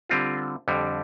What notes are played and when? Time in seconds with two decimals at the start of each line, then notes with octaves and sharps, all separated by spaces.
0.10 D3 G3 C4 F4
0.68 F2 D3 G3